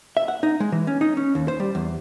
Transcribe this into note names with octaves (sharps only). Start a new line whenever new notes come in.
E5
F#5
D#4
G#3
E3
C#4
D#4
C#4
D#2
C5
G3
E2